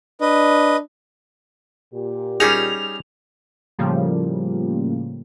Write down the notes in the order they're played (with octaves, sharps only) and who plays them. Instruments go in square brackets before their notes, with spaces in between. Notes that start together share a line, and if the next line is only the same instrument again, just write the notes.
[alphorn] D4 [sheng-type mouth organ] B4 D#5
[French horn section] A#2 G4
[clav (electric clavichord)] G3 C#4 D#4 [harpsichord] G#4 [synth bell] F7
[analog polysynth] A2 C#3 F3 G3 A#3